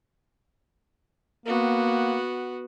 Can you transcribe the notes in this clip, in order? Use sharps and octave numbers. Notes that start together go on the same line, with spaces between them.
A#3 B3 F#4